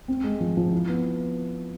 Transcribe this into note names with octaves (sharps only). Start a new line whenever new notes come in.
C4
G#3
F3
F3
E4
B3